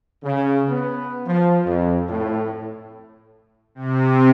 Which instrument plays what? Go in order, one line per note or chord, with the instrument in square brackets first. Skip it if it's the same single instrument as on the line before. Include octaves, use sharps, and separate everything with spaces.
[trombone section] C#3
B3
F3
F2
A2
[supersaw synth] C3